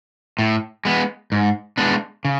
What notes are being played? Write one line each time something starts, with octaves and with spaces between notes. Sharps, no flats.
A2
G#3 B3
G#2
G#3 B3 D4
C#3